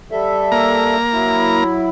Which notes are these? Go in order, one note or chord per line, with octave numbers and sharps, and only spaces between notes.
G3 A4 E5
A#3 A#5
F#3 E4